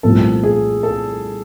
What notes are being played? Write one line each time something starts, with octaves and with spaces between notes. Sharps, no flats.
C2 A#2 F3 A3 C4 A4
G#4
A4